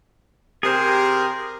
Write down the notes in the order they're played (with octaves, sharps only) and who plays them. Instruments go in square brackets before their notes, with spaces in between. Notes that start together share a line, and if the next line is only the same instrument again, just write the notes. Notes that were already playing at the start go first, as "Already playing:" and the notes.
[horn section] C3 G4 A#4 [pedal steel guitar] G#4 C5